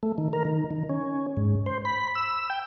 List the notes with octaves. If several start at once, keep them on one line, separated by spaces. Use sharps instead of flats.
A3
D#3
A#4
D#3
D#3
C#4
G#2
C5
B5
E6
G5